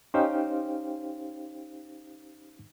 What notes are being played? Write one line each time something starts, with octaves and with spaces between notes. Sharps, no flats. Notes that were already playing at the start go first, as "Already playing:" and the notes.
C#4 D#4 G4 C5 F5 G5